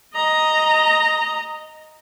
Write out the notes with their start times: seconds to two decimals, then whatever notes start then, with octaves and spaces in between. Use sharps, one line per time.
0.14 D#5 A#5